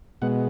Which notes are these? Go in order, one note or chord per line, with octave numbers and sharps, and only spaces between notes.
B2 G#3 B3 F#5